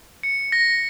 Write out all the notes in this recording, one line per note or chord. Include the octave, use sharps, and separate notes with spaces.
C#7
A#6